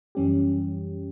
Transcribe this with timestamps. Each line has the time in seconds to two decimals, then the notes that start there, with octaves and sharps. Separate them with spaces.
0.15 F#2 E3 G3 C#4 G4